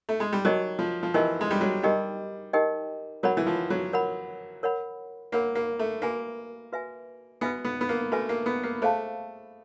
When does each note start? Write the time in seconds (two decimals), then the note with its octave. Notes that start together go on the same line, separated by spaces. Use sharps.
0.09 A3
0.20 G#3
0.33 G3
0.45 F#3 D#4 G4 A#4 D#5 G5
0.79 F3
1.03 F3
1.14 E3 D#4 G4 A#4 D#5 G5
1.41 G#3
1.51 G3
1.61 F#3
1.83 G3 D#4 G4 A#4 D#5 G5
2.53 D#4 G4 A#4 D#5 G5
3.23 F#3 A#4 C#5 F#5 B5
3.37 E3
3.46 F3
3.70 F#3
3.93 A#4 C#5 F#5 B5
4.63 A#4 C#5 F#5 B5
5.32 A#3 A#4 C#5 F#5 B5
5.55 A#3
5.79 A3
6.02 A#3 F#4 B4 E5 G#5
6.72 F#4 B4 E5 G#5
7.41 B3 F#4 B4 E5 G#5
7.64 B3
7.81 B3
7.89 A#3
8.12 A3 F#4 B4 E5 G#5
8.29 A#3
8.46 B3
8.63 A#3
8.82 A3 G#4 C5 F5 A5